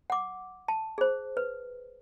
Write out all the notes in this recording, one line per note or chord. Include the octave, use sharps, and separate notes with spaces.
F#5 D6
A5
G#4 C5
B4